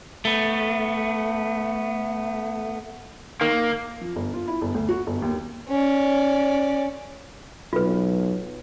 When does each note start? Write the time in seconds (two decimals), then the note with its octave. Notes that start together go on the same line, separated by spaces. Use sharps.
0.25 A3 B3
3.41 D#3 A#3
4.01 F3
4.16 G1
4.33 F4
4.48 E4
4.61 G1
4.74 D2
4.89 F#4
5.07 G1
5.22 D#2
5.69 C#4 D5
7.73 B1 F4 B4